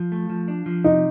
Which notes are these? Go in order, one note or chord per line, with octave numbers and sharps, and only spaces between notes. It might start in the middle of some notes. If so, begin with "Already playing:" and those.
Already playing: F3
A3
F3
D4
F3
C3 D#4